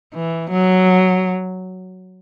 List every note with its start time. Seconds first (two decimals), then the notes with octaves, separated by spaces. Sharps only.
0.15 E3
0.51 F#3